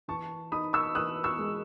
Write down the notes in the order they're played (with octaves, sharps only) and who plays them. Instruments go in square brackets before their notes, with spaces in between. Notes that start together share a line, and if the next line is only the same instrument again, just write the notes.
[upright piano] E3 A5 C#6
D#4 B5 D#6
C#6 E6
E3 D#6 F#6
C#6 E6
G#3